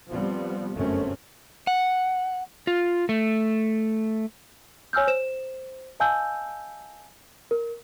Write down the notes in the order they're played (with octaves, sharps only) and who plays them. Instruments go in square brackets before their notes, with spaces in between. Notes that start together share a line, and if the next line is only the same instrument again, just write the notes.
[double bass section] F3 G3 B3 C4
G1 F#2 A3 C4 C#4
[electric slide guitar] F#5
F4
A3
[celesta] C#5 G#5 E6 F6 G6
C5 E7
D#5 F5 G#5 A5 E6 G6
A#4